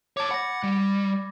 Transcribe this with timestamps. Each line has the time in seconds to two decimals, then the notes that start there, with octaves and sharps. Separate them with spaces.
0.17 C#5 A5 D6 G#6 A6
0.31 F#5 B5 A#6
0.63 G3